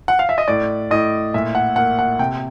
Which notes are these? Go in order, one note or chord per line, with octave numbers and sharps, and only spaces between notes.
F#5
F5
E5
D#5
A2 D5
A2 D#5
A#2 E5
F#5
A#3 F#5
F#5
C3 G5